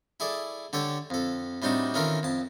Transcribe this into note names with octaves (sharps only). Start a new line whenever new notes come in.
E4 G#4 A4 D5
D3 G4 A4 C#5
F2 A4
A2 G3 C4 D4 D#4 F#4
D#3 E3 C#4 F4 A4 A#4
F2 A5